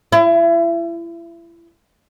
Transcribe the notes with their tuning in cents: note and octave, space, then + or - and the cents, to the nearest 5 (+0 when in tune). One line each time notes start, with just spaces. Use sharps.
E4 +35